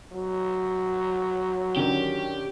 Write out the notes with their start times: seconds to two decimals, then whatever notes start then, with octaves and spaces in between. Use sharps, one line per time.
0.12 F#3
1.76 D3 D#3 C#4 G4